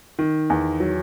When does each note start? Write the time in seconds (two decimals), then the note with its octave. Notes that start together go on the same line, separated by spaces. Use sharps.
0.19 D#3
0.50 E2
0.80 F#3